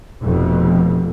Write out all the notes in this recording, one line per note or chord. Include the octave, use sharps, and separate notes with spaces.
F1 F2 B2